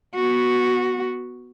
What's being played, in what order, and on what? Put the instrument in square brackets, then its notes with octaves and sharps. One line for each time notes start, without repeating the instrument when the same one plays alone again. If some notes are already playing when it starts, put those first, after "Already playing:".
[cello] B3 F#4